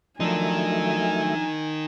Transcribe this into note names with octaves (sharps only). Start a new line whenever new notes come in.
F3 F#3 A3 D4 D#4 A#4 E5 G#5